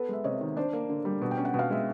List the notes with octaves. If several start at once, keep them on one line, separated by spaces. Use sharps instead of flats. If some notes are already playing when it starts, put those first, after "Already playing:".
Already playing: B3 A4 B4
G#3 E5
C3 C#5 D#5
D#3
D4 C5 D5
A#3
D3
G3
B2
G5
C#4
F#5
B2
F5
G#3 E5